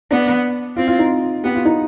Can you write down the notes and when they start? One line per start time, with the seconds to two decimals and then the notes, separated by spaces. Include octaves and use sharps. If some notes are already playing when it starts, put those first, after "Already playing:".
0.11 B3 D4
0.76 C4 F4
0.88 F4
0.99 D#4
1.44 B3 G4
1.55 F4
1.65 D#4